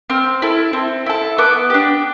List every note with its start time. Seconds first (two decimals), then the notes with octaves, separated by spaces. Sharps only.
0.10 C4 F6
0.42 E4 A4
0.73 C4
1.06 E4 A4
1.38 B3 D6
1.70 D4 G4